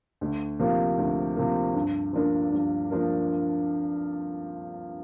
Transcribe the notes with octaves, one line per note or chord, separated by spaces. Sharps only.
D2
C3 F3 A#3
D2
C3 F3 A#3
G2
F3 A#3 D4 A#4
G2
F3 A#3 D4 A#4